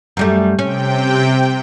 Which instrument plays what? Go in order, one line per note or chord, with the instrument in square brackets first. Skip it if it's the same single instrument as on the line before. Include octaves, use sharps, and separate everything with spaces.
[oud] F#2 G3 A3
[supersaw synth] C3 G5 [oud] C#4